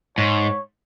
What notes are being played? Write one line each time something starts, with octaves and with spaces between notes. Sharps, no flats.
G#2 C#5